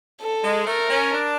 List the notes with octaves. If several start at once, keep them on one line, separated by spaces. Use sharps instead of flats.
A4
G#3
A3 A#4
C#4
D4